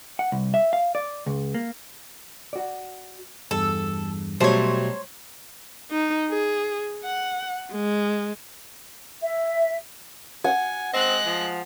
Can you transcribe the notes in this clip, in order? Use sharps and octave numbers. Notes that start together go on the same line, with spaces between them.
F#5
C2
E5
F5
D5
C#2
A#3
F#4 D5
E2 G2 A4
B2 F#3 G3 A3 C5 C#5
D#4
G#4
F#5
G#3
E5
F#5 G#5
G#3 C4 D#5 F#6
F3